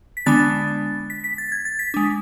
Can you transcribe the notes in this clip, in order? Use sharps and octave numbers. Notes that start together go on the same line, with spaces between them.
B6
D3 G#3 B3 D4 A6
B6
B6
A6
G#6
A6
B6
G#3 D4